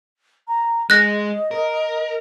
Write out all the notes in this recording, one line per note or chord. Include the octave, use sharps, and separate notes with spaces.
A#5
G#3 D#5 F#6 A#6
A#4